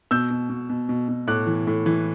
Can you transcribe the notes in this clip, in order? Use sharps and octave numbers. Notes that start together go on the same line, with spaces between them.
B2 E6 G6
B2
B2
B2
B2
B2
A2 D6 F#6
E3
A2
E3